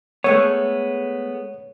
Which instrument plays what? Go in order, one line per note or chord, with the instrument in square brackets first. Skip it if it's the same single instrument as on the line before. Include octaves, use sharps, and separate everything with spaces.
[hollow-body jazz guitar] G#3 A3 B3 [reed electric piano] C#5